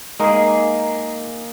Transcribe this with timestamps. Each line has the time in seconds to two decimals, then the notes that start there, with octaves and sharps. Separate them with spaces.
0.20 G#3 A#3 D#4 G#4 A#4